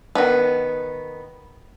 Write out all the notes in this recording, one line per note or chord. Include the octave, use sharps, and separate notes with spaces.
D#3 B3